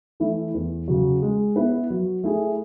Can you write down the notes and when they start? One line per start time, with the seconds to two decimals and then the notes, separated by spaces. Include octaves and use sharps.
0.20 E3 A3 E4
0.54 E2
0.88 C#3 F#3
1.22 G#3
1.56 B3 E4 B4
1.90 F#3
2.24 A3 E4 G#4